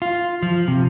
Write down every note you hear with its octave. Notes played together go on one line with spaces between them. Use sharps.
F4
F3
C3